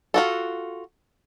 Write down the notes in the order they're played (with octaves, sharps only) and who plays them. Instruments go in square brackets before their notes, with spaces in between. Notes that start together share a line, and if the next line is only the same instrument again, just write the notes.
[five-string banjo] F4 F#4 A4